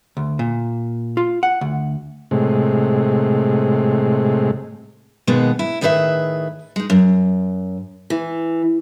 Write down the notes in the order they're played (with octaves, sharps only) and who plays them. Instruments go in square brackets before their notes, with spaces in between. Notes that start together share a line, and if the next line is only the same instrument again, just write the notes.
[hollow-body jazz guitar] D2
A#2
F4
F#5
D2
[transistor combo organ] A2 C3 G#3
[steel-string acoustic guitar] B2 D#3 G#3 A#3 B3
E4
A2 D#3 G#4 B4 C5 E5
G#3 D#4
F#2
E3